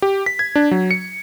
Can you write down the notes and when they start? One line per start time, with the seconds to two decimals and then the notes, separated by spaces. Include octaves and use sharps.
0.02 G4
0.26 B6
0.39 G#6
0.56 D4
0.71 F#3
0.91 C#7